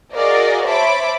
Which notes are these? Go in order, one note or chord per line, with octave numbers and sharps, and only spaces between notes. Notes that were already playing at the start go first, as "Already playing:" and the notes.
F#4 G#4 A#4 D5 D#5 F5
C5 C#5 E5 A5 B5 D6